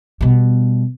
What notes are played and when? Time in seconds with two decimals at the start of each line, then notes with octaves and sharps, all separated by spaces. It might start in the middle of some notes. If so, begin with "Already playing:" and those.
0.21 B2 G3